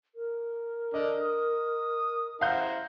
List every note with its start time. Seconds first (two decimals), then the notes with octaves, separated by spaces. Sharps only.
0.15 A#4
0.94 D3 D5 D#5
1.21 D#6
2.41 E4 C5 F5 F#5 A#5 G6